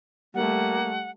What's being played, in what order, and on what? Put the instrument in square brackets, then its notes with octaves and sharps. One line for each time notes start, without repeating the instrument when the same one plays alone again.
[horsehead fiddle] G3 A3 [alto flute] A#3 [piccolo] F#5